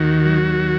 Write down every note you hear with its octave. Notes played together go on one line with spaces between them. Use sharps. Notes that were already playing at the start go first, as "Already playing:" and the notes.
Already playing: D#2 D#3 F#4
F#3